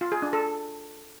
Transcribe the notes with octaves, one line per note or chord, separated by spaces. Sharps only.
F4
G#4
D4
A4